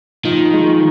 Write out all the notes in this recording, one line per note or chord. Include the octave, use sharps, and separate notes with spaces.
D#3 F3
G#3